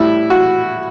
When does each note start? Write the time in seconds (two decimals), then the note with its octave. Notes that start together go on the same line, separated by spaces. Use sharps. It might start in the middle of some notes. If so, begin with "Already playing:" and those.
Already playing: A2 G3 E4
0.30 F#4